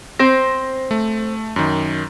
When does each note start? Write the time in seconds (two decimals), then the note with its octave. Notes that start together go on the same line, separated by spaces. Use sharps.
0.19 C4 C5 A#6
0.91 A3
1.56 F#2 D#3